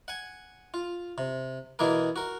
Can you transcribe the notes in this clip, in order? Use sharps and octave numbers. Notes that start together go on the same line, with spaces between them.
F#5 G#5
F4
C3
B2 E3 A#3 G#4 A#4
F#4 A#4